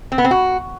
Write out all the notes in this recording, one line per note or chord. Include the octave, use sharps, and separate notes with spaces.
C4
B3
C4
F#4